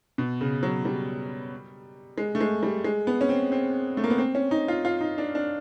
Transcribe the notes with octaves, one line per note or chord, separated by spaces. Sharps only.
B2
C#3
F#3
G3
G#3
A3
G#3
G3
G#3
B3
C#4
C4
C4
A3
A#3
B3
C4
C#4
D#4
F4
F4
D#4
D4
D4